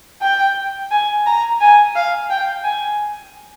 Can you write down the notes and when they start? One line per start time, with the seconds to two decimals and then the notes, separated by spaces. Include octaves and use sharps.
0.22 G5
0.91 G#5
1.26 A#5
1.61 G#5
1.96 F5
2.30 G5
2.64 G#5